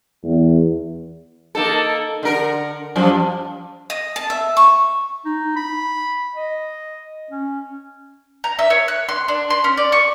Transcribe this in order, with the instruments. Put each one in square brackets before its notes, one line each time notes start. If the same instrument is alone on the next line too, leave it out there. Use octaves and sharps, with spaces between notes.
[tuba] E2
[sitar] A#3 D#4 A4
D3 A#4
F#2 F3 G3
[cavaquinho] D#5
A5
E5
C#6
[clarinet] D#4
B5
D#5
C#4
[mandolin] A#5
E5
C#5
F#6
C6
D4
C6
C#4
D5
C#6